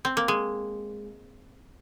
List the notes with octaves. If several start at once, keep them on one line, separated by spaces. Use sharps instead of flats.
C4
A#3
G#3